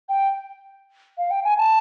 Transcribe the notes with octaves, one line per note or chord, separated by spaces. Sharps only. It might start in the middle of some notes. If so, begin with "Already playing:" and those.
G5
F5
G5
G#5
A5